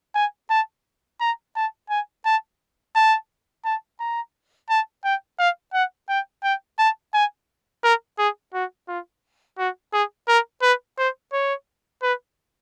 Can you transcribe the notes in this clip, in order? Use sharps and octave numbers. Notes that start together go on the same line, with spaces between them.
G#5
A5
A#5
A5
G#5
A5
A5
A5
A#5
A5
G5
F5
F#5
G5
G5
A5
G#5
A#4
G#4
F#4
F4
F#4
G#4
A#4
B4
C5
C#5
B4